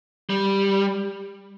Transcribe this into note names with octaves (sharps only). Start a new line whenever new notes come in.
G3